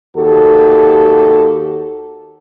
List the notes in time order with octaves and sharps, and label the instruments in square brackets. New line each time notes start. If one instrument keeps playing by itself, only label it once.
[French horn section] D#2 F#4 G4 A4